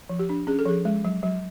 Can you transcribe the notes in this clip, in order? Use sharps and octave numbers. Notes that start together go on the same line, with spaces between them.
F3
G4
D4
C#4 G#4
A4
F3 G#4
G#3
F#3
F#3